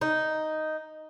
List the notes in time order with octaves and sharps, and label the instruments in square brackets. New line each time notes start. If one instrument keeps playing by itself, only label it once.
[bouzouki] D#4